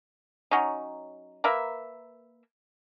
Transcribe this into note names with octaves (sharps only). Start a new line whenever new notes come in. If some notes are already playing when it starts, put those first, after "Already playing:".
F#3 C#4 D#4
A#3 A#4 B4 E5